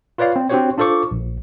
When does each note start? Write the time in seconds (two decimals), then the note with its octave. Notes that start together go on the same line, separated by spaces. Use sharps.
0.18 F4 B4 C#5 D5 F5
0.36 C4
0.50 C4 D4 F#4 G4 C5 C#5
0.78 D4 F4 A4 C5 C#6 D6
1.11 A#1